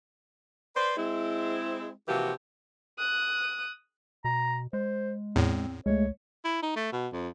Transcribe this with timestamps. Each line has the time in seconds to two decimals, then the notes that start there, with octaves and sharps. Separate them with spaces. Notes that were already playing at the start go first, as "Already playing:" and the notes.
0.75 B4 C5 D5
0.96 G#3 C4 E4
2.07 C3 E3 F3 A#3 F#4 G4
2.99 D#6 F#6
4.25 B2 A#5
4.73 G#3 C5
5.36 E2 A2 C4
5.86 C#2 G#3 A3 C#5
6.44 E4
6.63 D#4
6.76 A3
6.92 B2
7.13 F2